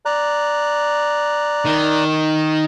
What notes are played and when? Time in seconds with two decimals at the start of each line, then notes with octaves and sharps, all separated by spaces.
0.05 D5 A#5 F#6
1.65 D#3